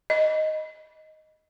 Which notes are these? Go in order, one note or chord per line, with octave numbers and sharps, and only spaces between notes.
D#5